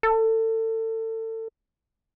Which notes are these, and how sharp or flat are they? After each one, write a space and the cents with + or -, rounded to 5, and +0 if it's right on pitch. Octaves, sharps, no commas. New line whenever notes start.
A4 +30